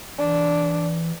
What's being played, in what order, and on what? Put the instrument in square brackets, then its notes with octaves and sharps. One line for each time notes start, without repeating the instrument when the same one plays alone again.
[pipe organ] E3 [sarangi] D4